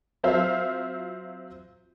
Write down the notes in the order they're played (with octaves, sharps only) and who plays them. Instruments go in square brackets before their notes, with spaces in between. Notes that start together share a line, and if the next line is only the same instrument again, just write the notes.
[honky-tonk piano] F#3 C4 F4 C5 E5 F5